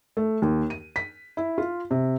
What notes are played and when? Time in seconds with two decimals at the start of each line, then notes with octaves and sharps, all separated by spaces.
0.17 A3
0.42 D#2
0.70 D#7
0.96 B6
1.37 E4
1.58 F4
1.91 C3